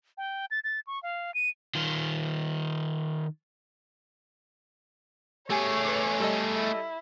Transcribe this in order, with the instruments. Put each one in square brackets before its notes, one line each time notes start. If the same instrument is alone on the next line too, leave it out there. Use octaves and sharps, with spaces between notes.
[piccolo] G5
A6
A6
C#6
F5
D#7
[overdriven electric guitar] D#3 F4
[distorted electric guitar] A3 G#4 [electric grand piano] G4 G#5 [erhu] C#5
[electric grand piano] B4 D6
G3 A4 D#5
[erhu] E4